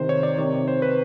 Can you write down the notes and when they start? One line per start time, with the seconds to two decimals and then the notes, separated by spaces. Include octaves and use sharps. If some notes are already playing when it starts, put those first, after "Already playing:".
Already playing: C3 D#3 C5
0.09 C#5
0.23 D5
0.38 C3 D#3 C#5
0.68 C5
0.82 B4